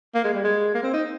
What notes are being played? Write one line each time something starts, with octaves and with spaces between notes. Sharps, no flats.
A#3
G#3
G3
G#3
A#3
C4
D#4